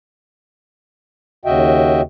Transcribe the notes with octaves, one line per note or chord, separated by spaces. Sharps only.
D#2 C#3 F#4 D#5 E5 G5